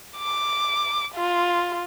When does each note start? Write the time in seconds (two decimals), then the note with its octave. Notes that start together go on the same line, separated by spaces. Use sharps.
0.18 D6
1.15 F4